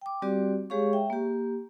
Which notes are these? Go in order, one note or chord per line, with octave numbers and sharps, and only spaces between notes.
G5 D6
G3 C4 F#4 G4 D5
G#3 G4 G#4 C#5 F5 C#6
E5 G5
A#3 G4